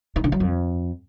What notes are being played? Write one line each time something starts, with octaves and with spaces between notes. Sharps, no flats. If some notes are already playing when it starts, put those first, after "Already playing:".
D#3
D3
F#3
F2